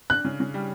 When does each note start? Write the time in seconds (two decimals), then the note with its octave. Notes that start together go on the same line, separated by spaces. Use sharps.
0.10 D4 F#6
0.25 C#3
0.40 C#3
0.54 G3